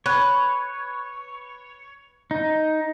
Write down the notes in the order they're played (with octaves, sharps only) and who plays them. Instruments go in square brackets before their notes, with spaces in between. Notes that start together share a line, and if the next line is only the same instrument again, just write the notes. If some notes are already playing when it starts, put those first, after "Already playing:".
[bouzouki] B4 [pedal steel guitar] C#5
[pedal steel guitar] D#4